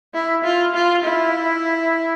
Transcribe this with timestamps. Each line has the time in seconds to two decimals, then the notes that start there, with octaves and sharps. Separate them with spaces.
0.14 E4
0.44 F4
0.75 F4
1.04 E4